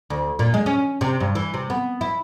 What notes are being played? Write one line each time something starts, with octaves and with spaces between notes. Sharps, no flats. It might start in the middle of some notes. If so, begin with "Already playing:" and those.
D2
A#2
G#3
C#4
C3
G2
E3
C3
B3
E4